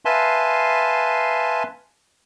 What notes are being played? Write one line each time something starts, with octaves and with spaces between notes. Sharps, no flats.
B4 E5 F5 G#5 A5 C6